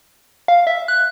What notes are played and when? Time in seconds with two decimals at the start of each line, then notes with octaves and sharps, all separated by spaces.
0.48 F5
0.67 E5
0.88 F#6